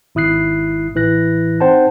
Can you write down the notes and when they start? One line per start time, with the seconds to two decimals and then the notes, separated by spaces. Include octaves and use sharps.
0.15 G#1 E4 D#6 F#6 C7
0.95 A1 A2 E3 E4 F#6 A#6
1.60 C4 D#4 C5 F#5 G5 A5